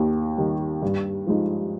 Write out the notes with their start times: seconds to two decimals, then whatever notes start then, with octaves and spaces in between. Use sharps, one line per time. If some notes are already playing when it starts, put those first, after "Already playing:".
Already playing: D#2 D#3
0.37 D#3 G3
0.82 G2
1.27 F3 G#3 D#4